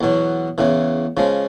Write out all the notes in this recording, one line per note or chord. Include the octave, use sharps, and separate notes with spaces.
E2 B2 F#3
E2 C#3 E3
C#3 F3 G#3